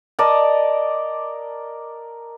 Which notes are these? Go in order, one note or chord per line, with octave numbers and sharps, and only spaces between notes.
A#4 D5 D#5 A5